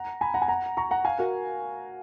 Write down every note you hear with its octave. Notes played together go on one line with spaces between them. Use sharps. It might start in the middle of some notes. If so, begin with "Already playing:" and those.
Already playing: F#5 A#5
G#5 B5
F#5 A#5
G#5
F#5 A#5
A#5 C#6
F#5 A#5
F5 G#5
F#4 A#4